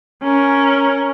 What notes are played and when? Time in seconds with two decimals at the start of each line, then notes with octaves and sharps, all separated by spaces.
0.23 C#4 A#4